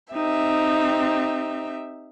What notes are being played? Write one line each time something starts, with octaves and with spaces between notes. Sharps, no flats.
C4 D#4 G4 E5